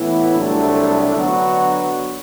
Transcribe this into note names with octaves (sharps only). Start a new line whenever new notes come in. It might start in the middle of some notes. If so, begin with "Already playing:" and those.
Already playing: A2 E3 B3 E4
C2 C3 F#3 A3 D4
D3 F#3 B3 D4 F#4